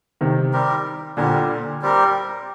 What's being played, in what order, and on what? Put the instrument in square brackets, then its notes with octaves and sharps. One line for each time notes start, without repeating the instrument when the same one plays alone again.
[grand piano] C3 D#3
[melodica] G3 C4 G4 A#4
[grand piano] A#2 D3 [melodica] G3 C4 G4 A#4
[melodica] G3 C4 G4 A#4